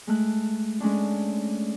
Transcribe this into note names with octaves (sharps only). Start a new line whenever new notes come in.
G#3 A3 F#6
G#3 A3 C#4 D4